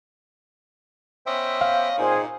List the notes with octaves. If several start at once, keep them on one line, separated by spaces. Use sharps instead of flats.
B3 C#4 C5 D#5 E5 G5
F5
A#2 C4 D#4 G#4 C5